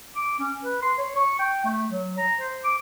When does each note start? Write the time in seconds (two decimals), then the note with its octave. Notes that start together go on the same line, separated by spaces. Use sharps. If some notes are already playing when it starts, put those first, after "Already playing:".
0.16 D6
0.39 C#4
0.63 B4
0.82 C6
0.98 C#5
1.16 C#6
1.39 G5
1.65 A3
1.90 F#3
2.18 A#5
2.39 C5
2.64 D6